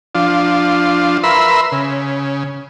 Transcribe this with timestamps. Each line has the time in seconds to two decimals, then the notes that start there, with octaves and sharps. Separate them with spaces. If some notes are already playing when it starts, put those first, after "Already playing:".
0.15 F3 D4 F4
1.24 A#4 B4 E5 B5 C6 E6
1.72 C#3